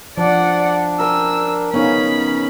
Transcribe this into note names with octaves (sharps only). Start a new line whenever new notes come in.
F3 D4 D5 F#5
A#4 G5 G#5 E6
C#3 B3 C#4 D#4 G#5 B5